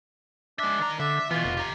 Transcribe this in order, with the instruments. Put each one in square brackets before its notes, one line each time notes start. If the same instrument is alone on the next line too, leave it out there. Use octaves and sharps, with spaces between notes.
[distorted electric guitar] G#3 E5 [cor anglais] D4
[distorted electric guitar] D#3 A#5
[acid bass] D3 [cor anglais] D4 [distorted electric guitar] E5
[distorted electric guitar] B2 B3 [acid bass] E3 [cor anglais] F4
[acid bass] F1
[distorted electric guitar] G4 A#5